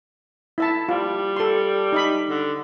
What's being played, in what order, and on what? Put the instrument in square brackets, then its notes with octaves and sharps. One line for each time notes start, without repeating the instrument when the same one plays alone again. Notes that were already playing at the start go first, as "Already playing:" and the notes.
[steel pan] E4 E5 A5
[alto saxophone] G3 [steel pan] F4
[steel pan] A4 C6
D#4 D#5 B5
[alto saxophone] D3